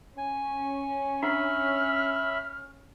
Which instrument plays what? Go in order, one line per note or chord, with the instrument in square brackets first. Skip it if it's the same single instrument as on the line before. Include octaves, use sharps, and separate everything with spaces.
[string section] C#4 [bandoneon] G#5
[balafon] D4 [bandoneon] E5 B5 [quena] F6